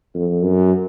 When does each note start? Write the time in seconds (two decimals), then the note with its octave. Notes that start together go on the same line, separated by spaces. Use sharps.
0.14 F2
0.42 F#2